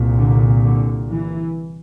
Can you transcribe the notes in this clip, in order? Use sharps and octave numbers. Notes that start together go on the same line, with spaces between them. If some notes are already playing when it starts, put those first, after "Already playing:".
Already playing: C2 A#2
D3
D3
E3